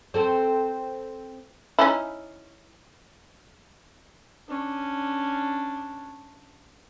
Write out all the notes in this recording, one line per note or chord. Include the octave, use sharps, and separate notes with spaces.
C4 A4 C5
C#4 D#4 E4
C#4 D4